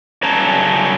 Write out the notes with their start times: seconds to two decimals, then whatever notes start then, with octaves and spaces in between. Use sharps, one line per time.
0.23 G2 C#3 F#3 C#5 A5 A#5